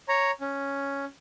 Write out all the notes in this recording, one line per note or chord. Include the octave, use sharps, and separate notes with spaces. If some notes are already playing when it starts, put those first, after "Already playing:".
C#5 A#5
C#4